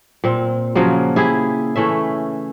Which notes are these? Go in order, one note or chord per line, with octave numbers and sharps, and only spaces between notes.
A#2 C4
C#3 F3 F#3 A#3
E4 G4 G#4
E3 A3 C#4 E5